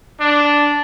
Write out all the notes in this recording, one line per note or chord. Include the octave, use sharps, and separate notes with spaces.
D4